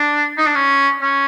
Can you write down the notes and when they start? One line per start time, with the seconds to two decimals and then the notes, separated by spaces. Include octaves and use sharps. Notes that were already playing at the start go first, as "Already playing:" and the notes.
Already playing: D4
0.38 D#4
0.46 D4
0.55 C#4
1.02 C#4